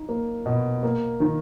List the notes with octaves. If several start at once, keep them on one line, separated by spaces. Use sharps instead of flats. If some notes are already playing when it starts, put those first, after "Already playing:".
Already playing: D#4
A#3
B2
A#3
D#3